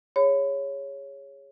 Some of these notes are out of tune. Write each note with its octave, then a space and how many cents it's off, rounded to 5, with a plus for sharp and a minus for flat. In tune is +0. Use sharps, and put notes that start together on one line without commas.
G#4 -20 C#5 +0 B5 +30